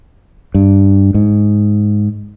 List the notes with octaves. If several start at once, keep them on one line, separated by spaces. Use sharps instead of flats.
G2
G#2